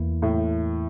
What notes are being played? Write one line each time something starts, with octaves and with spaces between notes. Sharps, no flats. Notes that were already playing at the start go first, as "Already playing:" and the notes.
Already playing: E2 E3 A#3 E4
A2